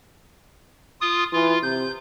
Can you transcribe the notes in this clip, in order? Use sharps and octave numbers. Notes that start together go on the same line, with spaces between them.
F4 D#6
E3 F4
C3 G6